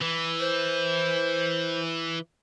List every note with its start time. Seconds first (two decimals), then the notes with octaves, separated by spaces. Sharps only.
0.01 E3
0.40 C5